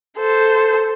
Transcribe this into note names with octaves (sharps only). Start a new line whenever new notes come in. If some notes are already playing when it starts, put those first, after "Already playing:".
A4 C5